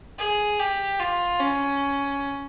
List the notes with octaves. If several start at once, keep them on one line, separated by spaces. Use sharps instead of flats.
G#4
G4
F4
C#4